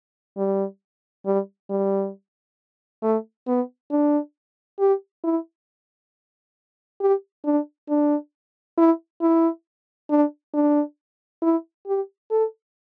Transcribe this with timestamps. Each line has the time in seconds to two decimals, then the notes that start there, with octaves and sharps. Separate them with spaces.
0.38 G3
1.26 G3
1.70 G3
3.03 A3
3.47 B3
3.91 D4
4.79 G4
5.24 E4
7.01 G4
7.45 D4
7.89 D4
8.78 E4
9.21 E4
10.10 D4
10.54 D4
11.42 E4
11.87 G4
12.31 A4